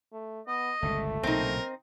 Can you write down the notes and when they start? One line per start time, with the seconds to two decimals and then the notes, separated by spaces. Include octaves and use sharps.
0.12 A3
0.47 B3 D#5
0.82 G1 C#2 A#2 A3
1.23 B1 A#2 C#3 C4 D#4 A#4